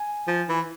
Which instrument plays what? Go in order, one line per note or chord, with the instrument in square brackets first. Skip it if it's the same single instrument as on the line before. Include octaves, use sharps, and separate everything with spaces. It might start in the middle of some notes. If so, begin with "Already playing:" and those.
Already playing: [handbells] G#5
[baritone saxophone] F3
E3